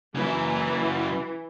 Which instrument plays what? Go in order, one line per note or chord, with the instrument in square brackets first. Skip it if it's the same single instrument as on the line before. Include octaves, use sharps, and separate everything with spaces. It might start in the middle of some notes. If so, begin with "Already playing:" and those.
[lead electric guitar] C#3 F#3 [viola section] E3